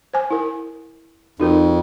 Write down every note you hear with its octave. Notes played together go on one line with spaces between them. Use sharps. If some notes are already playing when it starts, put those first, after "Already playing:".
C5 G#5
E4 A#4
F2 D#4 F#4 A#4